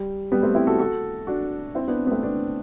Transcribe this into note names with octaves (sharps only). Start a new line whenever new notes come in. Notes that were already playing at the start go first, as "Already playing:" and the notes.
Already playing: G3
G3 B3
A3 C4
C4 E4
F#4 A4
F#4 A4
D4 F#4
C4 E4
B3 D4
B3
A3 C4
B3 D4